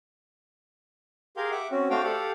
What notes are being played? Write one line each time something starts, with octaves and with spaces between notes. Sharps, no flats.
G4 G#4 A#4 F5 C6
E5 F#5 D6
C4 C#4 F#4
A3 D4 F#4 C5 F5 G5
G4 A4 F5 F#5